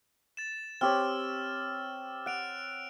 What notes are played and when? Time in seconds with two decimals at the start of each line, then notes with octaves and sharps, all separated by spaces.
0.37 A6 E7
0.81 C4 G4 C#5 E6 F6 A6
2.26 F#5 F#6 D7 F7